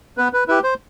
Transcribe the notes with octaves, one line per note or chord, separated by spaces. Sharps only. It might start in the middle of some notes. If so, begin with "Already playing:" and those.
B3 B4
B4
E4 G4 B4
C5